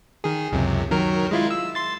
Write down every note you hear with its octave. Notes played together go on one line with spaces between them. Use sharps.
D#3 G#4
C#2 F#2 C3
D#3 F#3 A#4
G#3 E4 F4
E6
C6 A6